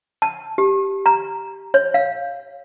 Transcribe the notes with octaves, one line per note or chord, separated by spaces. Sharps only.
A5
G4
A#5
C#5
F5